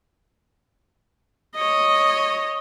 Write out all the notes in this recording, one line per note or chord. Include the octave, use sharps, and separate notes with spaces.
C#5 D#5